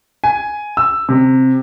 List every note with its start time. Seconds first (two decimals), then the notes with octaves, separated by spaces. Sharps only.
0.24 G#5
0.77 E6
1.09 C3